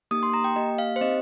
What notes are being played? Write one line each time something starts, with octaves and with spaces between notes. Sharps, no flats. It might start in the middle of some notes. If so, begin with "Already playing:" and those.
A#3 D#4 G4 D#6
C6
A#5
G5
A#3 G4 D#5
F5
C5
C4 D#4 G4 D#5